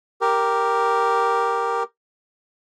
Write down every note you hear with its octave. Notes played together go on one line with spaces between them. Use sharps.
G4 A#4